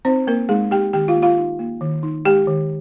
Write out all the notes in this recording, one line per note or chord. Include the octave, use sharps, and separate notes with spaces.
C4 D#4 C5
A#3 A#4
G#3 D#4 G#4
D#4 G4 G5
D#3 G4 G5
F4 F5
A#3
F4 F5
D#4
A#3
D#3
D#4
G#3 G4 G5
D#3